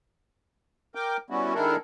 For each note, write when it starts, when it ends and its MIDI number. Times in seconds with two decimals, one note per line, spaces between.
0.95 1.17 70
0.95 1.17 79
0.95 1.17 86
1.30 1.54 55
1.30 1.54 59
1.30 1.54 61
1.30 1.54 64
1.30 1.54 66
1.54 1.76 51
1.54 1.76 56
1.54 1.76 62
1.54 1.76 64
1.54 1.76 69
1.54 1.76 70